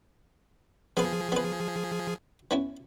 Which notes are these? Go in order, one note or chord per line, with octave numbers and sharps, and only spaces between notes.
F3 B3 G#4 B4
B3 B4
B3 C#4 E4